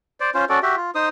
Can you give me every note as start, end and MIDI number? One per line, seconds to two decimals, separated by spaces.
0.20 0.30 72
0.20 0.30 74
0.34 0.45 61
0.34 0.45 65
0.34 0.45 72
0.49 0.59 61
0.49 0.59 66
0.49 0.59 69
0.49 0.59 74
0.63 0.76 66
0.63 0.76 67
0.63 0.76 76
0.77 0.91 65
0.95 1.09 63
0.95 1.09 72
0.95 1.09 87